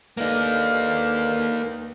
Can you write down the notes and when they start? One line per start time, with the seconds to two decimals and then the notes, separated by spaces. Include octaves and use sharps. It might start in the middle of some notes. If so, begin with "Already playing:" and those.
0.17 D3 A#3 D#4 B4 F5